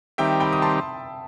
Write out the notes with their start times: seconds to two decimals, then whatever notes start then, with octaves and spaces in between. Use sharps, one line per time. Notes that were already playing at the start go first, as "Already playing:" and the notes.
0.18 D#3 G3 C4 D#4 G4 E5 G5
0.40 G5 B5
0.53 D#6
0.62 A5 C6